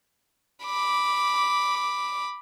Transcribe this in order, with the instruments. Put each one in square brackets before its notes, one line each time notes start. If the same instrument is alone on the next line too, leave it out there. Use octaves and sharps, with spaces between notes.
[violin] B5 D6